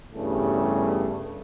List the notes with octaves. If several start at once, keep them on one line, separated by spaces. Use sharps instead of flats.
E2 G2 C#3 G3 A3